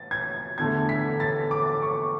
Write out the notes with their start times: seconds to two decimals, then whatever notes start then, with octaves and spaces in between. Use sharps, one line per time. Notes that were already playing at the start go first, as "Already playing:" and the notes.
Already playing: A6
0.11 G#6
0.58 E2 D3 A3 G#6
0.89 B6
1.20 A6
1.51 D6
1.82 C#6